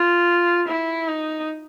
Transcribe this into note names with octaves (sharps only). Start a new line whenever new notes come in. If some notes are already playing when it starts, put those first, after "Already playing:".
Already playing: F4
E4
D#4